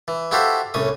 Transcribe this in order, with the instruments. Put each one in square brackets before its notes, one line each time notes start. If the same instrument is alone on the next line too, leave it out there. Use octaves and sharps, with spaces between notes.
[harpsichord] E3
E4 F#4 G4 A4 C5 F5
C2 A2 C#4 D#6